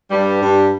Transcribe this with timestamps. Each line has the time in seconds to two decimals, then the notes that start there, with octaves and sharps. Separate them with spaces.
0.11 G2 G3
0.42 G2